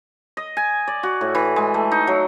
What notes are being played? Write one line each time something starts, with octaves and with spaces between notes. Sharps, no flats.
D#5
G#5
D5
F#4
A2
E3
G#3
A3
D#4
F#3